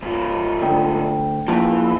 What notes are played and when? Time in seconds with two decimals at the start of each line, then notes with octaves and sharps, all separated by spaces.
0.03 G#2 F4
0.62 D2 G5
1.48 E2 A#2 E3 F3